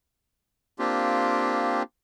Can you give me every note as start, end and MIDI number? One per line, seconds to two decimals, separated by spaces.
0.79 1.83 58
0.79 1.83 60
0.79 1.83 62
0.79 1.83 65
0.79 1.83 67